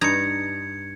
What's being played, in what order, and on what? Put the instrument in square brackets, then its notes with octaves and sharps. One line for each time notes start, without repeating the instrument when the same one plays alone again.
[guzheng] G2 D#4 A#5 [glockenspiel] G#6 C#7